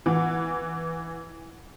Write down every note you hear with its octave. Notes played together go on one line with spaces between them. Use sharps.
E3 F#5